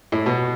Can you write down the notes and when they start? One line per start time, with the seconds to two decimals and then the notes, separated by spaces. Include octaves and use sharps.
0.12 A2
0.26 B2